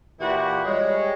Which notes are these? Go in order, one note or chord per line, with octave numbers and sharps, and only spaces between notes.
A#2 E3 E4 F#4 G4 B5
G3 G#3 C#5